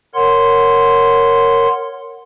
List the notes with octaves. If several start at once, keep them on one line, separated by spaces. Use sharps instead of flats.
A#4 C#5 F#5 C6